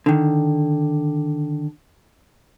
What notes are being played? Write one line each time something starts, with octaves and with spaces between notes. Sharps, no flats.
D3 D#3